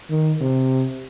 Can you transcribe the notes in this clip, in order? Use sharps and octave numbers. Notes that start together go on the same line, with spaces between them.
D#3
C3